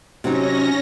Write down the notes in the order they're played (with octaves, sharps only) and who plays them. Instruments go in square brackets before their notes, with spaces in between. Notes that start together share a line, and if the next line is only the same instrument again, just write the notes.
[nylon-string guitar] C3 F#3 D#4 [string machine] C#4 A#6